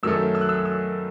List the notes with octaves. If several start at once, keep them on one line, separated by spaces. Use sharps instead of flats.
F#2 D#3 F#3 A3 E6
E6
F#6
E6
E6